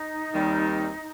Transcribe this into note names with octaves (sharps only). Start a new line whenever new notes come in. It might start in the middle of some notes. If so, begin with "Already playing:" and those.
Already playing: D#4
D#2 D#3 G3 C4